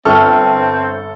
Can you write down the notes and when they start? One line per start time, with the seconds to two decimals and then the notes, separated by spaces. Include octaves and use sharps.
0.05 G1 C4 A4 B4 G5 A5 C#6 F6